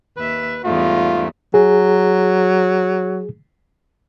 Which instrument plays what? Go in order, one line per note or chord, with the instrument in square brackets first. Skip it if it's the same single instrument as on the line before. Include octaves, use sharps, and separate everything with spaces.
[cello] D#2 E5 [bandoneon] B4
[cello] E2 G3 [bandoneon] G#2 A3 [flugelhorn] F4
[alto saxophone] F#3 [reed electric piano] G#4